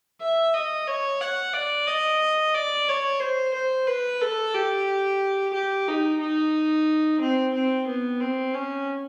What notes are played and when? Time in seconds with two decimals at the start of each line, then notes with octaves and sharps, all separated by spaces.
0.21 E5
0.54 D#5
0.87 C#5
1.21 F#5
1.54 D5
1.87 D#5
2.54 D5
2.88 C#5
3.20 C5
3.54 C5
3.87 B4
4.21 A4
4.54 G4
5.54 G4
5.88 D#4
6.20 D#4
7.21 C4
7.54 C4
7.87 B3
8.20 C4
8.54 C#4